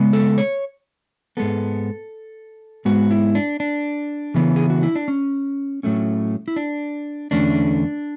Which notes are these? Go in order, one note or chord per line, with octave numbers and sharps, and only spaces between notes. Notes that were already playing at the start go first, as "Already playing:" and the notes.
Already playing: C#3 G#3 B3
A4
C#5
G#2 G#3 B3 A4
G#2 G#3 B3 F#4
E4
D4
D4
C#3 E3 B3
G#4
F#4
E4
D4
C#4
A2 F#3 A3 C#4
E4
D4
E2 D3 A3 C#4 D4